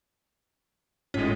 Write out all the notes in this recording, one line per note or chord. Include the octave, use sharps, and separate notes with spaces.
G#1 A2 G#3 C#4 F4 C#5